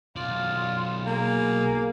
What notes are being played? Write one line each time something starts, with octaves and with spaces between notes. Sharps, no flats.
B1 F4 D5
A#3 G#4